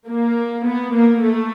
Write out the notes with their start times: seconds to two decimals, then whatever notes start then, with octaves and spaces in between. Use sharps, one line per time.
0.08 A#3
0.66 B3
0.95 A#3
1.23 A3